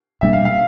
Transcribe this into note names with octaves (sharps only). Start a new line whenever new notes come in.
B2 G3 A#3 D4 E5
F5
F5